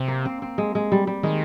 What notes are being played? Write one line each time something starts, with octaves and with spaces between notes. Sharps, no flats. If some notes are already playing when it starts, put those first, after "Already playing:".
Already playing: C3 C4
A#3
C4
C4
G#3
G#3
G3
G3
D#3 G#3